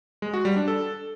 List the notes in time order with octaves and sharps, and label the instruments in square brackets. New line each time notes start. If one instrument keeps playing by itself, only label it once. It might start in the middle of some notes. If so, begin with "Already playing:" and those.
[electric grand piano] G#3
F#4
G3
D4
A4